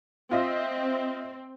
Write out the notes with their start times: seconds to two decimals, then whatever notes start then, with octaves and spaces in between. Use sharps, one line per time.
0.31 C4 F4 D#5 E5